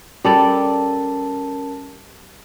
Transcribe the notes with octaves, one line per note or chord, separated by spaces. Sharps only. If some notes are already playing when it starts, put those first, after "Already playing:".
G3 C#4 A4 A#4 D5 A5